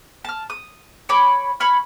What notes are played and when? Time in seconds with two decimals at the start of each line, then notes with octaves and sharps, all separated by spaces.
0.25 A5 F6
0.50 D#6
1.09 C#5 B5 D6
1.60 C#5 B5 F6